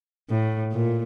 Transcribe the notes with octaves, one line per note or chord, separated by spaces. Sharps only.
A2
A#2